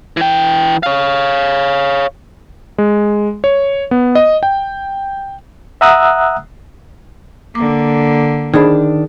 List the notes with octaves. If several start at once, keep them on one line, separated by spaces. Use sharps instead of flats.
E3 G5
C#5 F5
G#3
C#5
B3
D#5
G5
E5 F#5 A#5 D#6 E6 F#6
D3 A#3 D6
D#3 D4 G#4 C5 B5